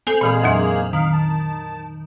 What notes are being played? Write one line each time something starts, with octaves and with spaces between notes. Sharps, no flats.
C4 A4 G#5 F7 F#7
A#2 E3 G#3 A#3 G#4 G#5
F2 F#3 D4
D#3 F5
A5